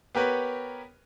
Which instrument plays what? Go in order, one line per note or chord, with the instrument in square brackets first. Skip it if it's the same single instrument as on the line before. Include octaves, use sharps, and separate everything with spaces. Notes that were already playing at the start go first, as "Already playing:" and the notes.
[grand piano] B3 G4 A#4 B4 C#5